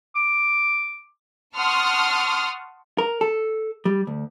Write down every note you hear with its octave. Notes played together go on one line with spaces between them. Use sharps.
D6
F#5 A5 C6 C#6 D#6 F6
A#4
A4
G3
D2